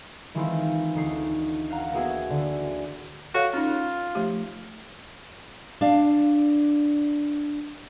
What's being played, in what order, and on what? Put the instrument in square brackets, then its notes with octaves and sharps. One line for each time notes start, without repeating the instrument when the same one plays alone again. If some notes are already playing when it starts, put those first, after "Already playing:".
[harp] D#3 E3 G#3 C4 E4 F4
D2 D#4 C7
F5 F#5 A#5
A#3 B3 E4 F#4 G#4
D3
[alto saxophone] F#4 [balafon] A4 C#5 F5
[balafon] C#4 D#4 [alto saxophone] F4
[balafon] F3 A3 G4
[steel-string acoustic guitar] D4 F5